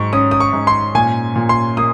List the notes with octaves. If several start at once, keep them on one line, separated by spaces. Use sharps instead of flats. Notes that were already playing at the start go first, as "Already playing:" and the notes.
Already playing: G#2 F#3 C#6
C#4 D#6
D#6
C#6
G#2
C6
A#2 G#5
A#2
C6
A#3 D#6